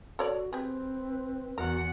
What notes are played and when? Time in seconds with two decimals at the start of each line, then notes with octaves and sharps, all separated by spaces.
0.19 F#4 A4 C#5 D5
0.53 C4 G4 G#4 B4
1.58 E2 F#4 A#4 F#5